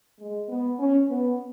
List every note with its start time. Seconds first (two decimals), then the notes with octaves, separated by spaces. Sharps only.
0.19 G#3
0.49 B3
0.79 C#4
1.08 B3